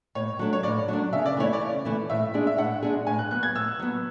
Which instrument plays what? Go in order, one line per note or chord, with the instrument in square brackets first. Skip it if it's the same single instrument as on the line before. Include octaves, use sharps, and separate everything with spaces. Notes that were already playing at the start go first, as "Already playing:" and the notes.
[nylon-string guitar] A2 [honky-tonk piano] C#5
[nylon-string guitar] F#3 A3 D4
[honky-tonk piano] C#5
[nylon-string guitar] A2 [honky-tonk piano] D5
[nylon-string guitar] F#3 A3 D4
[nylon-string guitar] C#3 [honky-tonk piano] E5
[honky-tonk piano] D5
[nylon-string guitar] E3 A3 E4 [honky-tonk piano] C#5
[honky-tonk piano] D5
[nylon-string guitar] C#3
E3 A3 E4
[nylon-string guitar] A2 [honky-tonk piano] E5
[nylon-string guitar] G#3 D4 G#4
[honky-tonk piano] E5
[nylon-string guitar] A2 [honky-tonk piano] F#5
[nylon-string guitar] G#3 D4 G#4
[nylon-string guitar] A2 [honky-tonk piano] G#5
[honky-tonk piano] F#6
[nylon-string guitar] F#3 B3 [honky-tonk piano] F#6
[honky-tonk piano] G#6
[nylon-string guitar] A2 [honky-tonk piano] E6
[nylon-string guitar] F#3 B3